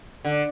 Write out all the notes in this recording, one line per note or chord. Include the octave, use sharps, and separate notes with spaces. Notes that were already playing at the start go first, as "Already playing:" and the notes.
D3